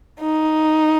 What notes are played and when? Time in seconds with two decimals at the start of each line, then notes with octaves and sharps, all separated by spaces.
0.20 D#4